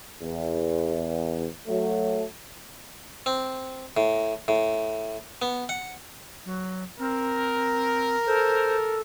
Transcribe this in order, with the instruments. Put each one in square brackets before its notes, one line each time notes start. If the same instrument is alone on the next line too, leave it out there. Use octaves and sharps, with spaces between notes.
[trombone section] E2
F#3 A3
[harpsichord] C4
A2
A2
B3
F#5
[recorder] F#3
[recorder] C4 [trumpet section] A#4
[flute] A4 [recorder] C5